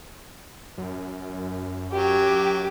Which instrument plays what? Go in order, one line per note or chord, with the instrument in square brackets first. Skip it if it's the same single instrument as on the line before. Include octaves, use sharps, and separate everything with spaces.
[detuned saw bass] F#2
[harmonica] F#3 [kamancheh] G4